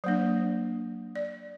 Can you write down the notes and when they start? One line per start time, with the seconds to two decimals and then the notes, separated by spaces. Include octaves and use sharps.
0.04 F#3 A#3 D4 C5
1.16 D5